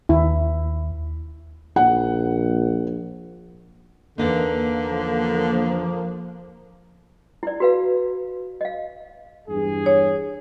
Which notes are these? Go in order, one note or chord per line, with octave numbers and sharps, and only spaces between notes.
D#2 E4
A#1 F#5
E2 D3 A#3 D4 D#4
F3
E4 D5
F#4 B4 F5
D#5 F5
E2 G2 G#4
C#5